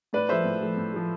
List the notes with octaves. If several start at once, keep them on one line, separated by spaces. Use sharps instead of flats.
A2 B4 D5
F3 A3 C5 E5
A2
F3 A3
A2
F3 A3